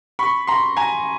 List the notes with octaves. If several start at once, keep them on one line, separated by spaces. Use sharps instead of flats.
B5 C#6
A#5 C6
G#5 A#5